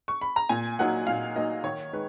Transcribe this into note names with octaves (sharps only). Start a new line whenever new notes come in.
C#6
B5
A#5
A#2 G#5
F#3 A#3 D#4 F#5
A#2 F5
F#3 A#3 D#4 D#5
D#3 C#5
G#3 D#4 B4